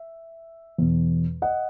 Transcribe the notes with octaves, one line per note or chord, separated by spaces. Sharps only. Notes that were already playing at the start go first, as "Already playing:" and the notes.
Already playing: E5
E2 B2
D#5 F#5